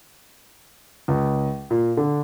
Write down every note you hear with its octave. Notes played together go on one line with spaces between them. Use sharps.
C#2
A#2
D3